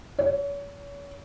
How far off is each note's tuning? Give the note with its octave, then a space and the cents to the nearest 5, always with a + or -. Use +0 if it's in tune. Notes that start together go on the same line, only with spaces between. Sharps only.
C#5 +35